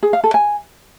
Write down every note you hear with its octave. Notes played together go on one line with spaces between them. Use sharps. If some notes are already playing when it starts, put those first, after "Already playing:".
G#4
F5
A4
G#5